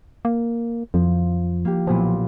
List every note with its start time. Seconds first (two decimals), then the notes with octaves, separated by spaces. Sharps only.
0.25 A#3
0.94 F2 F3
1.65 A#3 G4
1.87 B1 A#2 F3 B3